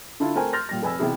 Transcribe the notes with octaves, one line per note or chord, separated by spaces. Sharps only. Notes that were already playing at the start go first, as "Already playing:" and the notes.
D3 D4 E4 F4
A3 C4 A#4 C5 G#5
C6 F6 G6 A6 A#6
A#2 G3 A#6
F1 B4 G#5 B5 E6
B1 C3 E3 E4 G#4